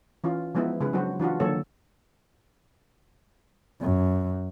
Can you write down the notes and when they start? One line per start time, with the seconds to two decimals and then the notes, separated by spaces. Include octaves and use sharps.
0.24 E3 C#4 F4
0.55 F3 G#3 B3 D#4 E4
0.81 C#3 G#3 G#4 B4
0.93 F#3 D4 F#4 C5
1.20 E3 D4 F4 F#4
1.40 D3 D#3 F#3 A#3 A4 C#5
3.82 F#2